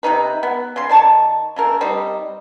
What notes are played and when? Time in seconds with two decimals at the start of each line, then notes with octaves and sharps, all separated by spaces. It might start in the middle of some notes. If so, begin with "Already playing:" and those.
0.03 C3 F#3 D#4 B4
0.43 B3
0.76 C#3 C6
0.89 D#3 D5 A5 C#6
1.56 C#3 A3 A#4
1.81 G3 C4 D#4